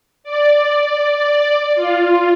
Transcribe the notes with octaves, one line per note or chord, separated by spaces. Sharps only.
D5
F4